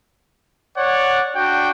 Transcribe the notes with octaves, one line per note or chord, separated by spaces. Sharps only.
C#5 D5 F#5
D4 F#4 G5